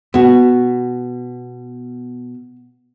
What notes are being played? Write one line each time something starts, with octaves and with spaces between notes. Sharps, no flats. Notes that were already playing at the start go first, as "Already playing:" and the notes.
B2 B3 F#4